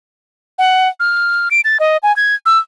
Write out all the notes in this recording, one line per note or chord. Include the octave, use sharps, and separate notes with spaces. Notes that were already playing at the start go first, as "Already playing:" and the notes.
F#5
F6
D7
A6
D#5
G#5
G#6
E6